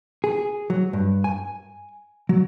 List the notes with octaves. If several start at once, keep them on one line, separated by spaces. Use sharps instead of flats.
G#4
F#3
G2
G#5
F#3